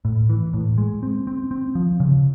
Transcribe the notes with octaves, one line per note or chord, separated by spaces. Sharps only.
A2
E3
A2
G#3
C4
C4
C4
F3
C#3